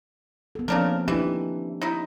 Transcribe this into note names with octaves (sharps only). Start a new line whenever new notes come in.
B3 A4
C#3 F3 A#3 C4 D4 A#4
E3 D4 D#4 G4
D#4 E4